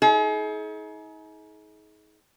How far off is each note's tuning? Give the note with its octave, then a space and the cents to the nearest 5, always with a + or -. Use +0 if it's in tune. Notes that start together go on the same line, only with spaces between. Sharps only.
D#4 +40 G#4 +35